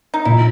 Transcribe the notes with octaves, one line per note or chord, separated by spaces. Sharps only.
D#4
A#2 E4